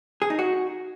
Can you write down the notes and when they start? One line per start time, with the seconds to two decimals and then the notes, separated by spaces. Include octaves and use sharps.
0.22 G#4
0.30 D#4
0.39 F#4